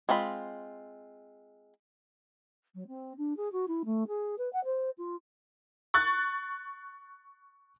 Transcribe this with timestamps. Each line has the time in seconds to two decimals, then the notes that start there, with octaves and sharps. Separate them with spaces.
0.09 G#3 C4 F4 B5
2.75 F#3
2.87 C4
3.17 D4
3.36 G#4
3.52 F#4
3.67 E4
3.85 A3
4.07 G#4
4.38 B4
4.52 F#5
4.64 C5
4.98 F4
5.94 C#6 F#6 A6